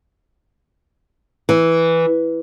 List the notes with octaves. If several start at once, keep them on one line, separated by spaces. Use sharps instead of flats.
E3